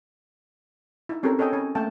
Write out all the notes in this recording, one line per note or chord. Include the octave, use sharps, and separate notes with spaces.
D#4 E4
C4 C#4 G4 A4 A#4
A4 C#5 D#5 G5 G#5
C#4 G#5
A3 A#3 G5 A5